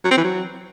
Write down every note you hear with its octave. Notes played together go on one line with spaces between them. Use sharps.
F#3
C4
E3
F#3